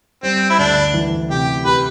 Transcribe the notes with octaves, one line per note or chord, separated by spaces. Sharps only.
G3 C4
E4
D2 D4
E3
C3 G4
G4 B4